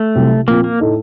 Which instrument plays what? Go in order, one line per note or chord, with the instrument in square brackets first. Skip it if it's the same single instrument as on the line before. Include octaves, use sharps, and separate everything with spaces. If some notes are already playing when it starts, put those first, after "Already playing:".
Already playing: [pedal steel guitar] A3
[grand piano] C2 C3 F#3 C4
[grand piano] A#2 F3 C4 [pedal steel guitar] A#3
[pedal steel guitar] A#3
[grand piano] A2 A3 D#4 A4